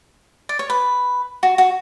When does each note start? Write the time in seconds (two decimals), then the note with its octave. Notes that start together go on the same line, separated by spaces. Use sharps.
0.49 D5
0.59 C#5
0.70 B4
1.43 F#4
1.58 F#4